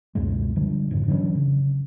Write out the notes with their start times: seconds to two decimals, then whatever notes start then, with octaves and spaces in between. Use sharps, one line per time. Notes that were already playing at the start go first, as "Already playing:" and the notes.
0.15 C#2 F#2 B2 G#3
0.56 D3 F3 G3
0.91 F2 G#2 D3
1.08 D3 E3 F#3 C#4
1.35 C#3